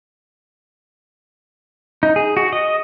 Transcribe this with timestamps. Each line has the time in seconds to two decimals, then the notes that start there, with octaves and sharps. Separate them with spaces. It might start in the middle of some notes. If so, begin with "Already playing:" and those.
2.03 D#4
2.16 G#4
2.37 F#4
2.53 D#5